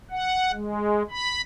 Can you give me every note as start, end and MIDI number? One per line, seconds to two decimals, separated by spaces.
0.11 0.52 78
0.52 1.03 56
1.10 1.41 83